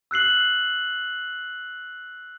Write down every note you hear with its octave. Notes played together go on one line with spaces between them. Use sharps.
E6 F#6 C7 F#7